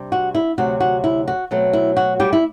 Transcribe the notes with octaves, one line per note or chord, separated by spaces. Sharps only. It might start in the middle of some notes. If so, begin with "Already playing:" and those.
Already playing: C3 G3 D4
F#4
E4
D2 C3 F#3 F#4
F#4
E4
F#4
B2 F#3 A3 C4
E4
F#4
G3 G4
E4